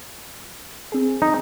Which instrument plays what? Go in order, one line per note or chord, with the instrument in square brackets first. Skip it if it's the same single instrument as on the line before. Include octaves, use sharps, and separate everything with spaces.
[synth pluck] C4 G#4
[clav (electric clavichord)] D#4